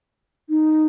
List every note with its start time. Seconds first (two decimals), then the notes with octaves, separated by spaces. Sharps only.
0.49 D#4